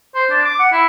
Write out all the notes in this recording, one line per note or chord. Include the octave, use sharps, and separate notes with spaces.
C5
D4
D6
F#5
E4